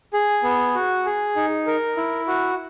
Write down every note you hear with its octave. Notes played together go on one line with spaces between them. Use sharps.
G#4
B3
F#4
G#4
D#4
A#4
E4
F#4